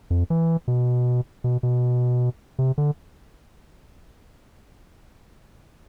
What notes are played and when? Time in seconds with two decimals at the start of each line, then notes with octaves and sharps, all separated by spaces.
0.10 F2
0.30 E3
0.68 B2
1.44 B2
1.63 B2
2.59 C3
2.78 D3